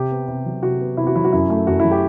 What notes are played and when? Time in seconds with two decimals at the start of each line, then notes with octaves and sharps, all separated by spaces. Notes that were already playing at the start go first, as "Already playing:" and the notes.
Already playing: C3 G4
0.11 B3
0.28 C3
0.46 F#3
0.63 C3 F#4
0.81 B3
0.97 C3 E4
1.07 F#4
1.16 F#3 E4
1.25 F#4
1.33 F#2 E4
1.50 A3
1.67 F#2 F#4
1.80 E4
1.85 F#3
1.91 G4